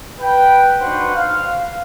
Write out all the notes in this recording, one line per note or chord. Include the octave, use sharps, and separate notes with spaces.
B4 G5
D4 D#4 F#4 B4 C5 F#5
F5